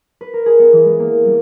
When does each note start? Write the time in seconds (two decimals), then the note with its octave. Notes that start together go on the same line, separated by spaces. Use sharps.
0.21 B4
0.34 A#4
0.46 G#4
0.59 B3
0.73 E3
0.86 G#3
0.99 A#3
1.25 G3